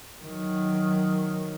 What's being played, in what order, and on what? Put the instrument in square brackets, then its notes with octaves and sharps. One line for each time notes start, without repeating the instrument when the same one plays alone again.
[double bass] D#3 F#3